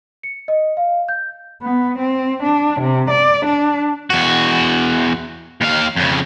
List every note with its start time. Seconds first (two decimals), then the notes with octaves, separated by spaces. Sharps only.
0.23 C#7
0.48 D#5
0.77 F5
1.09 G6
1.62 B3
1.98 C4
2.43 D4
2.80 C3
3.10 D5
3.46 D4
4.10 E2 F#4
5.61 D#2 F5
5.96 F2 C#3